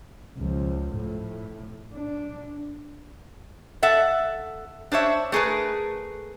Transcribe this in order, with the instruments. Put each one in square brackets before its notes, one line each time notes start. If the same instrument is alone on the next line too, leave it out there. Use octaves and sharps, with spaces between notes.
[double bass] C#2 F3
A2
D4
[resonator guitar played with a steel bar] A4 E5 F#5
D4 C5 C#5 E5
A3 G#4 A#4 B4